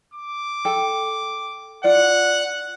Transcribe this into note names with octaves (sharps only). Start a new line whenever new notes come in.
D6
A4 G5
F4 D5 F#5